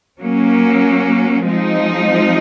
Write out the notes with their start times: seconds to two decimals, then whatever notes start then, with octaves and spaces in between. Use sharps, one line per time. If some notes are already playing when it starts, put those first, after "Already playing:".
0.19 F#3 A#3 C#4
1.48 F3 G#3 C4 D#4